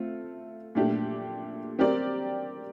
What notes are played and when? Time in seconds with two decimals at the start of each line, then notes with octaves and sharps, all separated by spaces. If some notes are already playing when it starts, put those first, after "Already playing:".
Already playing: A3 C4 F4
0.75 A#2 A3 D4 G4
1.79 C4 G4 A#4 D5